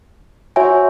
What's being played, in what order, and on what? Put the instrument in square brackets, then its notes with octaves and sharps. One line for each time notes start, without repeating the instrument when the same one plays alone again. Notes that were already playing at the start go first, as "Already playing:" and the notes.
[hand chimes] F#4 C#5 E5 G#5